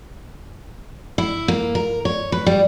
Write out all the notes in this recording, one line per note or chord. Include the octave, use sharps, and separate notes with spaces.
E4
A#3
A#4
C#5
B4
G3